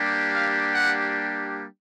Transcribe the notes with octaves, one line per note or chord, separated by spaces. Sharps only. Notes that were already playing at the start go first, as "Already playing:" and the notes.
Already playing: G3 A#3 D4 G4
F5
F#5